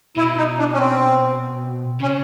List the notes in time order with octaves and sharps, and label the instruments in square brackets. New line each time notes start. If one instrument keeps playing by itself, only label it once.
[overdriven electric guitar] B2 [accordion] E4
[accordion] D#4
D4
C#4
C4
[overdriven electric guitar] C#3 [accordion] C#4